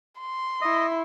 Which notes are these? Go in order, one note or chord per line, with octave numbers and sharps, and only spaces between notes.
C6
E4 D#5